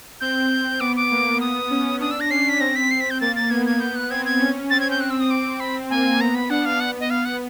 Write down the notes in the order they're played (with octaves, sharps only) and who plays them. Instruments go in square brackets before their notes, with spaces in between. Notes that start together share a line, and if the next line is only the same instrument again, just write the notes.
[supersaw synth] C4 [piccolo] G6
[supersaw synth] C4
[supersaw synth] B3 [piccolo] D6
[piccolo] D6
[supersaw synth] A#3
[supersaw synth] B3 [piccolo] D#6
[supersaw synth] C#4
[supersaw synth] D4 [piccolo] D#6
[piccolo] E6
A#6
[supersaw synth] C#4 [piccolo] C7
[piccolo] B6
[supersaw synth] C4 [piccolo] A#6
[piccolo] B6
C7
B6
G6
[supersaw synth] A#3 [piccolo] A6
[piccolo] A6
[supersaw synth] B3 [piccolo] G#6
[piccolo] G#6
[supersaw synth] B3 [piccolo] G6
[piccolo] F#6
[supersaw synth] C4 [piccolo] G#6
[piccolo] G#6
[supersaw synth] C#4
[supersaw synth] C4 [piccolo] A6
[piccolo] G#6
G6
[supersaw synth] C4 [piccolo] F#6
[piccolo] E6
D#6
D6
B5
[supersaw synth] A#3 [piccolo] G#5
[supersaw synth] B3 [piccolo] A#5
[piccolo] B5
[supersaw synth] D4 [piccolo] F#5
[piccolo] F5
[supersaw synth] B3 [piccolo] F#5
[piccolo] D#5
[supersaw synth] B3 [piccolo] F5
[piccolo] F#5